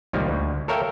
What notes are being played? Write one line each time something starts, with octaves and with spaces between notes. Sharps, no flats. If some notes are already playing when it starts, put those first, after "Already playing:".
C#2 A#2 D#3 F3 G3 A#3
D2
A4 A#4 C#5 E5 F5 G5